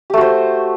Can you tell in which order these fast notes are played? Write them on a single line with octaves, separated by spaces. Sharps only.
G4 A3 F#4 C5